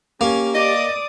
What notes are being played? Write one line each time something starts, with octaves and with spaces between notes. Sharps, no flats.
A#3 C#4 G4
D5 D#5 D6 D#6